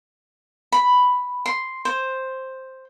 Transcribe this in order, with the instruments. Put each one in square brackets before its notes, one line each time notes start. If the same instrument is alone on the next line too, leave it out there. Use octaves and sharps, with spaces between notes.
[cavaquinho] B5
C6
C5